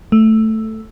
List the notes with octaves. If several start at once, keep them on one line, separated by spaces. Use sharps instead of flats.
A3